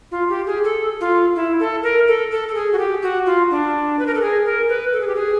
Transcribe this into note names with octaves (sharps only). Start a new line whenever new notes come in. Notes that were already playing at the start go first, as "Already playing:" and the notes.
F4
G4
G#4
A4
F4
E4
A4
A#4
A4
A4
A4
G#4
F#4
G4
F#4
F4
D4
B4
A#4
A4
G#4
A#4
B4
A4
G#4
G4
G#4